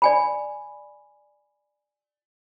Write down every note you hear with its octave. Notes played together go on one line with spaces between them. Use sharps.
D5 G#5 B5